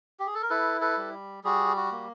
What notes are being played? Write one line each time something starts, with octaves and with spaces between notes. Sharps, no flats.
G4
G#4
A4
A#4
E4 A4 B4
A4 B4
G3
G3 F#4 G#4
F#4
A#3